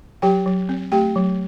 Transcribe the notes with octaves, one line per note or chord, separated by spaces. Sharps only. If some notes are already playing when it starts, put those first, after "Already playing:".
F#3 G4 G5
F#3
C4
A3 G4 G5
F#3